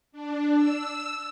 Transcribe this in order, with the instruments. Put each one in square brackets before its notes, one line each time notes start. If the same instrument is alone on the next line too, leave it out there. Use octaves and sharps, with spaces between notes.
[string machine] D4
E6